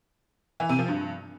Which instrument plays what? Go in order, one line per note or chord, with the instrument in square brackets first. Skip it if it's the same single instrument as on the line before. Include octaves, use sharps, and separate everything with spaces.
[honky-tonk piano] E3
C3
F3
G2